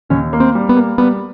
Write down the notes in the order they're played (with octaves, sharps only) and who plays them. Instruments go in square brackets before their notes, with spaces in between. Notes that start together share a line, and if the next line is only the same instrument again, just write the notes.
[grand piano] D#2 [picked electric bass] C#4
[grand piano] A#3
[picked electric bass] C4
[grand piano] G3
[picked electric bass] B3
[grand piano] A#3
[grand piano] G3 [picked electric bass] B3